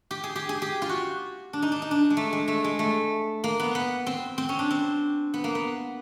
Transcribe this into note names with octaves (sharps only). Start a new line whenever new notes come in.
G4
G#4
G4
G#4
G4
F4
F#4
D4
D#4
D4
D#4
D4
G#3
A3
G#3
A3
G#3
A3
A#3
B3
B3
C4
C4
C#4
D4
C4
B3
A#3
B3